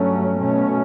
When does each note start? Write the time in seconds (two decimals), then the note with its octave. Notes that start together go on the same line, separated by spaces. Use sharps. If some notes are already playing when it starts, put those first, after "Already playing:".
Already playing: G2 F#3 A3 C#4
0.40 B2 A3 C#4